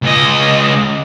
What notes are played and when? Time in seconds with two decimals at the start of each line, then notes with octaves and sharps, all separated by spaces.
0.02 C#2 D#5